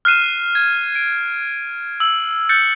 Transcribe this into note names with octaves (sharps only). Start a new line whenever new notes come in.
F6 F#6 C7 D#7 E7
G#6
D7
E6 F#7
F#6 G6 A6 C#7